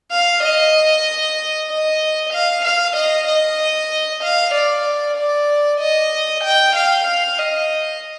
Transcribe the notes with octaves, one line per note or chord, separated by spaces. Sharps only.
F5
D#5
D#5
F5
F5
D#5
D#5
F5
D5
D5
D#5
G5
F5
F5
D#5